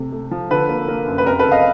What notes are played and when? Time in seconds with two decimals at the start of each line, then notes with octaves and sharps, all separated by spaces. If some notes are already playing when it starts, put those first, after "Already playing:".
Already playing: C3 A3
0.12 A3
0.31 F3
0.51 D3 A4 B4
0.69 A#3
0.88 A#3
1.07 F#2
1.18 B4
1.26 F2 A#4
1.39 A4 B4
1.46 C#3
1.51 D#5 F5